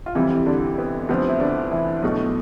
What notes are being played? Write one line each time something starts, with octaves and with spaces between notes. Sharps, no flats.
F4
F2 C3 E3 G3 E4
D3 D4
B3
D2 C3 F3 B3 C4
E4
D3 D4
E3 E4
B1 B2 A3